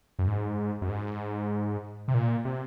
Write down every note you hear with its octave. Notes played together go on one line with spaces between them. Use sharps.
F#2
G#2
F#2
G#2
C3
A#2
C3